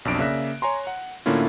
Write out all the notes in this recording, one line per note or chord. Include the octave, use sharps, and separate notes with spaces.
B1 F2 D4 D7
C#3 A#3 D5 E5 F#6 A#6
C#5 G#5 A#5 C6
F#5
A2 D3 A#3 C#4 E4 F4